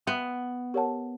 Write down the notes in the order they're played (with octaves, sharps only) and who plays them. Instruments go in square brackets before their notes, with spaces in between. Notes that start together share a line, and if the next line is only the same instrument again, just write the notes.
[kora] B3 [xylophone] E5 G5 C6 D#6
[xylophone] G4 A#4 C#5 F#5 A5